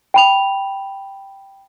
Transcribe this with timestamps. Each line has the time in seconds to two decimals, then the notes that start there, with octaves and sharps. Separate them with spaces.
0.14 G5 B5 F7